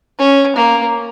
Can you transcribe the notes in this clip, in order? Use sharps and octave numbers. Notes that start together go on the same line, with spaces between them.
C#4
A#3